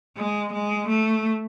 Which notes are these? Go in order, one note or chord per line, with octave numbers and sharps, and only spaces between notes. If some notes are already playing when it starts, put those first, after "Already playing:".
G#3
G#3
A3